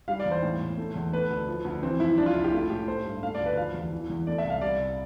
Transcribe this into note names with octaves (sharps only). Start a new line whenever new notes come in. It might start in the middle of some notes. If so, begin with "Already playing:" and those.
G3 F5
D5
E2
C5
A2
A2
A3
E2
A3 B4
D2
F3
D2
E3 C4
F2 E4
G3 D4
F4
C2 E4
G4
A3 F4
A2 G4
A3 C5
G2
A3 F5
D5
D2
B4
F3 F5
E2
E3
E2
A3 D5
E5
C2
F5
G3 D5
C2